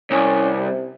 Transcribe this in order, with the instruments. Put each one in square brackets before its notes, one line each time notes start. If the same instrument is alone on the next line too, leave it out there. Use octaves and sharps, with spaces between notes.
[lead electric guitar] C2 [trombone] C#4
[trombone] C3